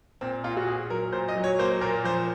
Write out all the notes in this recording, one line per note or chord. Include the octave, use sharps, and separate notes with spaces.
A#2 C4
A#2 F4
F#4
A#2 G#4
F#3 A#4
A#2 C5
D#5
F#3
C#5
A#3 C5
A#2 A#4
F3 C5